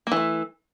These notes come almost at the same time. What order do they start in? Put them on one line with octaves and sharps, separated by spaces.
A#3 E3 A3